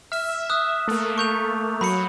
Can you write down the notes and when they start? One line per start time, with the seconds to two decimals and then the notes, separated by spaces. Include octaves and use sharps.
0.12 E5 F6
0.50 D#6 E6 F#6
0.88 A3 A#3
1.18 C#6 G6 F7
1.81 F#3 B5 C#7